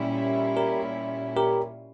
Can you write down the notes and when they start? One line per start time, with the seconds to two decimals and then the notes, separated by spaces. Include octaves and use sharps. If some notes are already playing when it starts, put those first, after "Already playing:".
Already playing: A#2 G3 C#4 E4
0.56 G4 A#4
1.36 G4 A#4